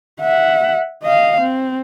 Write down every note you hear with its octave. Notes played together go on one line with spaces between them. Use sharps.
E5 F#5
D#5 F5
C4